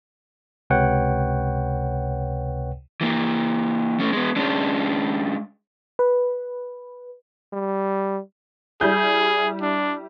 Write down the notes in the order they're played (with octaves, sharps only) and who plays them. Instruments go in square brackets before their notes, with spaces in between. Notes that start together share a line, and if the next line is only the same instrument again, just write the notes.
[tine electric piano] C#2 C3 B4 C#5 F#5 G5
[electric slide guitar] E3 A#3
A3 C#4
G#3 B3
G#3 C#4 D4
[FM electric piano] B4
[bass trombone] G3
[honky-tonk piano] G3 E4 G6 [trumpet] G#4
[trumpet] D4